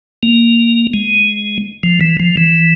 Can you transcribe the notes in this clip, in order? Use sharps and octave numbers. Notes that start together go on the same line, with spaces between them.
A#3
G#3
F3
E3
F3
E3